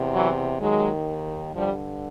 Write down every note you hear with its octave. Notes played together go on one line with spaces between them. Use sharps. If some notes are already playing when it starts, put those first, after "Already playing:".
Already playing: E2 C3
E3 F#3
D#2 D#3 F#3 G#3
G2 D3 F3 G3